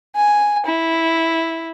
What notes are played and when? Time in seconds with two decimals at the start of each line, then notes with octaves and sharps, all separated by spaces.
0.16 G#5
0.66 E4